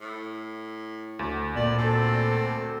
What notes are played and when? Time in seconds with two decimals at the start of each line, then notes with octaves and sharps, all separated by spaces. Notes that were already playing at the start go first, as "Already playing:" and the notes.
0.01 A2
1.19 D2
1.56 A#2 D5
1.78 C4 A4